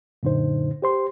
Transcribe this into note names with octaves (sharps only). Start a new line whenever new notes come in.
F#2 A#2 D3 D#4 C5
G4 C5 C6